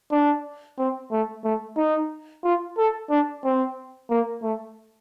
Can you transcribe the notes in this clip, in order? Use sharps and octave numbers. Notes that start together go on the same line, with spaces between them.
D4
C4
A3
A3
D#4
F4
A4
D4
C4
A#3
A3